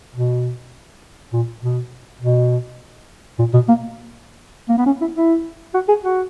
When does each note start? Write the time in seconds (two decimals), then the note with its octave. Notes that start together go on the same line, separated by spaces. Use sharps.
0.15 B2
1.33 A#2
1.62 B2
2.22 B2
3.39 A#2
3.54 B2
3.68 A#3
4.69 A#3
4.78 B3
4.86 C#4
5.01 E4
5.16 E4
5.74 F#4
5.88 G#4
6.03 F#4